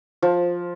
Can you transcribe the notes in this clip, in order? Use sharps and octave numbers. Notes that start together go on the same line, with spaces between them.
F3